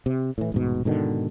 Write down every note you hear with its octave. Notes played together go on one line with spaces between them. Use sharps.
C3
A2 E3
D#1 G#2 B2
G#2 B2 D3 D#3